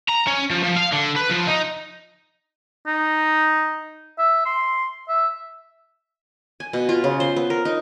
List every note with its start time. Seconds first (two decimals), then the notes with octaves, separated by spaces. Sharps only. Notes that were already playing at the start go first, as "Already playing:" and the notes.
0.09 A#5
0.27 C#4
0.51 F3
0.63 F3
0.77 F5
0.93 D3
1.16 B4
1.30 F3
1.47 D#4
2.87 D#4
4.19 E5
4.46 C6
5.09 E5
6.60 G#5
6.73 B2
6.89 F4
7.04 C#3
7.20 C5
7.36 B3
7.50 A#4
7.65 D#4